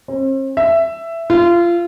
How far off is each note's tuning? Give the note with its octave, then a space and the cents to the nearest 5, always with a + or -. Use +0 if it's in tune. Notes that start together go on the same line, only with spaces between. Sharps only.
C4 +45
E5 +10
F4 -25